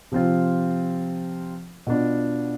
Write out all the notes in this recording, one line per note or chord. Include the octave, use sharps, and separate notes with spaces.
C3 F3 C4 F4
B2 B3 D4 F4